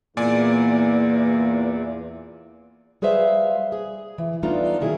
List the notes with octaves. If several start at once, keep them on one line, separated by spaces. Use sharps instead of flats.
E2 A#2 A#3 D5 G#5
G3 G#4 B4 C5 E5 F5
G#4
E3
G3 A3 B3 D4 D#4 F4
B2 D#3 F#3 E4 G#4